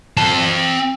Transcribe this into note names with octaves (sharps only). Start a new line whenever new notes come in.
C4 A5